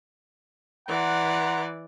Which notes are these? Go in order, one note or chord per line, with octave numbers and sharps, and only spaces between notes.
E3 D5 F#5 A#5 C6